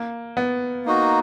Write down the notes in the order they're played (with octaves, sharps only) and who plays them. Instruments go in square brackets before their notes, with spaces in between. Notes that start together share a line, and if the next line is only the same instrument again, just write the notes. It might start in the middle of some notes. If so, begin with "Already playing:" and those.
Already playing: [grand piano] A#3
B3
[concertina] A#3 D#4 F#4